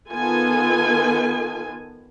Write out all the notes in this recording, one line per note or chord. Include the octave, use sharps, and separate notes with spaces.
D#3 B3 F4 A4 G#5